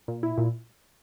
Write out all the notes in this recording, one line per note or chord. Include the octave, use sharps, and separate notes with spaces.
A#2
E4
A#2